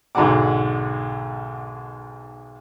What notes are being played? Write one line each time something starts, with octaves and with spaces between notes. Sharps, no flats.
B1 G#2 D3 F#4 F#5 D6